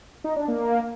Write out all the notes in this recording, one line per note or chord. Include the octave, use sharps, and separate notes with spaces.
D#4
D4
A#3